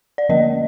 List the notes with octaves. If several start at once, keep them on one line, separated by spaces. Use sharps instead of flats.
D5
D3 F3 A#3 C#4 D#5